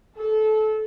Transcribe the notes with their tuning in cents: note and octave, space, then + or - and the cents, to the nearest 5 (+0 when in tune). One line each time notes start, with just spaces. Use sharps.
A4 -25